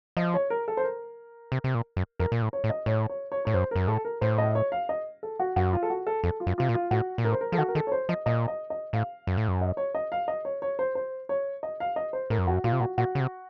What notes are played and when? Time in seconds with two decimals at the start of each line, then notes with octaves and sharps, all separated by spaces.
0.17 F3 D#5
0.34 C#5
0.50 A#4
0.68 A4
0.77 C5
0.84 A#4
1.52 C3
1.64 C3
1.75 A#2
1.97 F#2
2.19 F2 A#4
2.32 A#2
2.42 A2
2.53 C#5
2.64 A2
2.70 D#5
2.86 A2 C#5
3.09 C#5
3.32 C#5
3.45 A2 C#5
3.54 F#2 C5
3.71 F#2 A#4
3.88 A2 A4
4.05 A#4
4.21 A2 C5
4.38 D#5
4.55 C#5
4.72 F5
4.89 D#5
5.23 A4
5.40 F#4
5.56 F#2 F#4
5.73 F4
5.83 A4
5.90 F#4
6.07 A4
6.24 F2 A4
6.40 F4
6.47 F#2
6.58 C3 F4
6.69 A#2
6.74 F4
6.91 A2 F#4
7.18 A#2
7.25 A2 A#4
7.33 C5
7.41 A#4
7.52 F3 A4
7.58 D#3 F#4
7.68 A#4
7.75 D#3 A4
7.87 C#5
7.92 C5
8.09 F3 D#5
8.26 A#2 D#5
8.48 D#5
8.70 D#5
8.93 A2 F5
9.27 F#2
9.37 A2
9.48 F#2
9.61 D#5
9.77 C#5
9.95 D#5
10.12 F5
10.28 D#5
10.45 C#5
10.62 C#5
10.79 C5
10.95 C5
11.29 C#5
11.63 D#5
11.80 F5
11.96 D#5
12.13 C5
12.30 A2 A#4
12.38 F#2
12.46 F2 F#4
12.54 F#2
12.64 A#2 F4
12.72 C3
12.80 A#2 F#4
12.98 A#2 F#4
13.15 C#3
13.20 C3